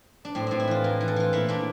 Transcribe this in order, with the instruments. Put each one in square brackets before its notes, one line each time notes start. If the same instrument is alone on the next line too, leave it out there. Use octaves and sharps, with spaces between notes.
[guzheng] D4
A2 C4
A2 C4
E4
E3 F4
A2 A#4
E3
A4
E3 F4
A#2 E4
A#2 D4